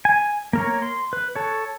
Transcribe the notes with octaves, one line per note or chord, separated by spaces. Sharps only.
G#5
A#3 A#4 C#5
C6
B4
A4 C#5